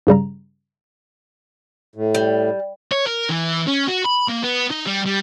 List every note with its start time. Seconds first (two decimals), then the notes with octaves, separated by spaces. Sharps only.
0.07 G2 C#3 G3 A#5
1.95 A2
2.15 G3
2.92 C#5
3.07 A#4
3.30 E3
3.68 C#4
3.88 F#4
4.05 B5
4.29 A#3
4.44 B3
4.71 D#4
4.87 G3
5.06 G3